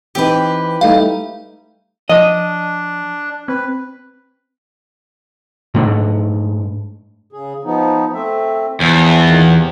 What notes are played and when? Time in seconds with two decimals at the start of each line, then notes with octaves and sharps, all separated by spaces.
0.15 E3 C4 D#4 G4 B4
0.81 G3 A3 D#4 F5
2.09 F3 D4 D#5
3.48 C4 B4
5.74 G#2 A3 D4
7.33 C#3 G#4
7.64 F3 B3 D#4
8.13 A3 C4 E5
8.80 E2 F3
9.24 A#2 D#3 F4
9.48 C3